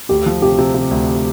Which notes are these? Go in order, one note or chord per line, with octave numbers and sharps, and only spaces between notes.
D2 G4
F3
C3 G4
C3
C3
D2